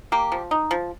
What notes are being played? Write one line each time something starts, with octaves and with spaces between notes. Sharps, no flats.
A#3 G4
F3
D#4
F3